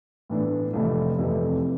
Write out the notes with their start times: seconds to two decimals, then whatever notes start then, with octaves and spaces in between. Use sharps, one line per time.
0.30 A2 E3 B3 D4
0.73 F1 F2 C3 E3 A3
1.18 F1 F2 C3 E3 A3